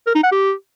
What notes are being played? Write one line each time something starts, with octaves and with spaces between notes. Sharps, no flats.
A#4
D#4
F#5
G4